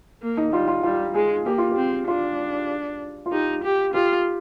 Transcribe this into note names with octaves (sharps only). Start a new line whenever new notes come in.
A#3
D#4
G3 F4
F4
G3 F4
G#3 G#4
A#3 G4
F4
G4
C4
D4 F4
F4
D#4 G4
G4
F4 G4